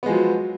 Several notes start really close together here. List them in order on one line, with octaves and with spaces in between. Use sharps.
B3 G#3 F3 F#3